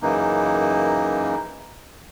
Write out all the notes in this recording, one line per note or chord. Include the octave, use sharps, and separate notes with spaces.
F#2 C#3 E3 A#3 D#4